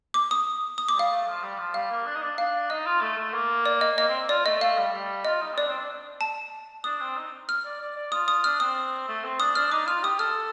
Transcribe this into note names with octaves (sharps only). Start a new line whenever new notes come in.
D6
D#6
D#6
D6
G3 F5
A3
F3
G3
F3
G3 F5
A#3
D4
D#4
D4
D4 F5
D#4 D#5
F4
A3
A3
A#3
D5
D#5
A#3 D#5
C4
F4 D5
A3 D#5
A3 F5
G3
G3
F4 D#5
D#4
C4
D4 D5
C4
D4
A5
D4 D#6
C4
D#4
F6
D5
D5
D5
F4 D#6
D#6
D4 F6
C4 D#6
A3
C4
D4 D#6
D4 F6
D#4 D6
F4 F6
G4 D#6
A4 F6